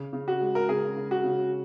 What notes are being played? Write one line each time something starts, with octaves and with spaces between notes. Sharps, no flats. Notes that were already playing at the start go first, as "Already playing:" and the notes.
Already playing: C#3
C#3
F#4
G#3
A#4
C#3 G#4
C#3
F#4
C#3